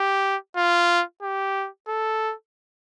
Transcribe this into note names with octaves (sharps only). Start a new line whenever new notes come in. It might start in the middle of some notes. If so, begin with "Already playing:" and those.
Already playing: G4
F4
G4
A4